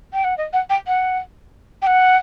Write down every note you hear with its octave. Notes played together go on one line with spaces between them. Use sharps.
G5
F#5
D#5
F#5
G5
F#5
G5
F#5